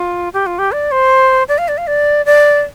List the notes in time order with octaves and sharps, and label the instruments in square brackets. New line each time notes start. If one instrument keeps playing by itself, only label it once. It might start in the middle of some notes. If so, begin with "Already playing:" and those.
Already playing: [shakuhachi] F4
G4
F4
G4
D5
C5
D5
F5
D5
F5
D5
D5